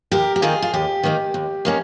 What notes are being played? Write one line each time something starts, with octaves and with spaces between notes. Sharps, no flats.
D#2 G4 A#4
G4
D#3 A#3 D#4 F4 G#4
F4
D#2 G4
D#3 A#3 D#4
D#2
D#3 A#3 C#4